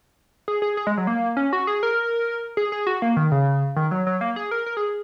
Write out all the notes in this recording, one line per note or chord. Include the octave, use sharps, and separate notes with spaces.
G#4
G#4
G#4
G#3
F#3
A#3
C#4
F#4
G#4
A#4
G#4
G#4
F#4
A#3
D#3
C#3
D#3
F#3
F#3
A#3
G#4
A#4
A#4
G#4